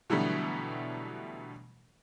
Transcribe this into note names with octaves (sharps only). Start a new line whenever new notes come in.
B2 D3 E3 F#3 G3 A3